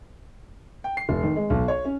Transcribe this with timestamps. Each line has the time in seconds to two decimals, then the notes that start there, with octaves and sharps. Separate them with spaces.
0.84 G5
0.97 C7
1.09 F1
1.23 D#3
1.36 G#3
1.50 B1
1.68 C#5
1.85 C#4